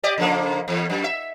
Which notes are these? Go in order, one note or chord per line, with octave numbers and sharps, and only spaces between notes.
G4 D5 D#5
C#3 F3 A#3
E2
F#2
E5